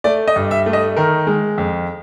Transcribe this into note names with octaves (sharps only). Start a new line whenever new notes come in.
A3 D5
D#5
G2
E5
A3
D#5
D#3 A#4
G#3
F2